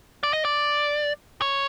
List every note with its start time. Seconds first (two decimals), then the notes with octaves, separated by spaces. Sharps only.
0.23 D5
0.33 D#5
0.45 D5
1.42 C#5